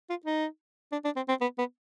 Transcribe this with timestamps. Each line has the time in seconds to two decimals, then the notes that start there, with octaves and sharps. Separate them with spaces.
0.10 F4
0.26 D#4
0.92 D4
1.05 D4
1.16 C4
1.29 C4
1.41 B3
1.59 B3